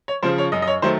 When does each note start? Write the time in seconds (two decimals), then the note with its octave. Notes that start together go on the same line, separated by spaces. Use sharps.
0.08 C#5
0.23 C#3 F3 C5
0.38 C#5
0.52 F#2 D#5
0.62 D#5
0.67 C#5
0.82 D#3 F#3 A3 C5